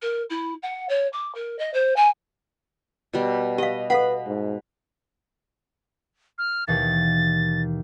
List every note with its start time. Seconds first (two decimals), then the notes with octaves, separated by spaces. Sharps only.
0.01 A#4
0.29 E4
0.62 F#5
0.88 C#5
1.12 D6
1.34 A#4
1.58 D#5
1.73 C5
1.96 G#5
3.13 B2 G3
3.58 G4 D#5 F5
3.90 A4 B4 F5 F#5 B5
4.27 G#2
6.38 F6
6.68 D#2 B2 E3 A6